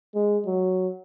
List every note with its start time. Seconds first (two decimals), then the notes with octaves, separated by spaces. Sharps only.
0.15 G#3
0.46 F#3